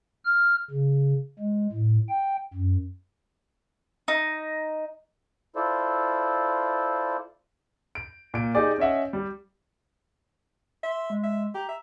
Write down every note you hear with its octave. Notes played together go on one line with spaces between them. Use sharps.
F6
C#3
G#3
A2
G5
F#2
D#4
E4 F4 A4 C5 D5
D7
A#2 D7
D#4 G4 G#4 D5
C#4 C#5 D#5 E5 F#5
G3
E5 C6
G#3
E5
G4 A#5
E5